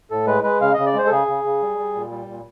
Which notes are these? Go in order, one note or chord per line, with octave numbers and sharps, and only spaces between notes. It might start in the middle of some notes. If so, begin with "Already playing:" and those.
A2 A4
G#3 B4
G#3 B4
C#3 F5
C#3 D#5
D5
G#3 C5
A4
C#3 G#4
C#3
C#3
G3
G3
A#2
G3
A#2